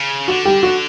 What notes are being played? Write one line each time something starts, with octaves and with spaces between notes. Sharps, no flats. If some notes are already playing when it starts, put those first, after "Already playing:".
Already playing: C#3
D3 F#4
G3 G4
F#4